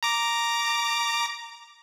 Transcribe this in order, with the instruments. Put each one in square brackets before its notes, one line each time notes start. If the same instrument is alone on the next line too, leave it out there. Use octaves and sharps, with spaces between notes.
[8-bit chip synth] A#5 D6